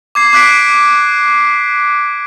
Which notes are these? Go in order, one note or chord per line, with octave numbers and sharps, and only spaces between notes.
D6 G#6 C7
D6 F#6 B6 D7